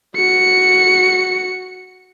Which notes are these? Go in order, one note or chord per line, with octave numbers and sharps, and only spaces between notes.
F#4 C#7